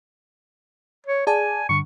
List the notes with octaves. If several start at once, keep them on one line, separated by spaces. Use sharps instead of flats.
C#5
G#4 D5 G#5 A5
G2 D3 C#6